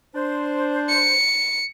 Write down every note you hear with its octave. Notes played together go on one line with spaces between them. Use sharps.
D4 C5
C#7